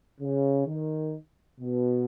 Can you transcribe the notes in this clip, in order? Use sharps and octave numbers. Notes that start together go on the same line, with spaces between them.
C#3
D#3
B2